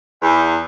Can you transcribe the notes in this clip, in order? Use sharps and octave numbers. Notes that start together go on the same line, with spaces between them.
E2